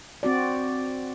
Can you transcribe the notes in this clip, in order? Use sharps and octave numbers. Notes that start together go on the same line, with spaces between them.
C4 F#4 D5